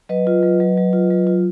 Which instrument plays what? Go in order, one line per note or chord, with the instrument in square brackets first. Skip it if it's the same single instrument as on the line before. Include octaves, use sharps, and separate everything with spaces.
[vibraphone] F#3 B4 D#5
F4
F#3
F#3
F#3
F4
F#3
F4